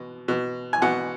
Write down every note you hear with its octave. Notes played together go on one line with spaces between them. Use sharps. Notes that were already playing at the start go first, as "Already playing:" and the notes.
Already playing: B2
B2
G#5
B2 F#5